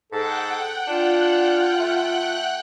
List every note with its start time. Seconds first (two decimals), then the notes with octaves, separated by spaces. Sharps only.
0.12 G#2 A4 F#5 G5 F#6
0.87 D4 F4
1.79 A3